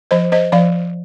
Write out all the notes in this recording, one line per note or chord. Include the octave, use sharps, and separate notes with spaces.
F3 C5 D#5
C5 D#5
F3 D5 F5